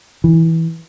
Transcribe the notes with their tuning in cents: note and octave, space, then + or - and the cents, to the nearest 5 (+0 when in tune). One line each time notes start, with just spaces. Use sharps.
E3 -15